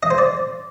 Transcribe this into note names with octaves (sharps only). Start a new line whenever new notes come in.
D#5
C5
D5